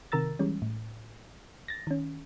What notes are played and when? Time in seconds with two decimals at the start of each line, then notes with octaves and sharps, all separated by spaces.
0.12 C3 D#3 A#4 A#5 E6 A6
0.39 E3 G3 G#3 C#4
0.62 A2
1.68 A6 A#6
1.87 D#3 C#4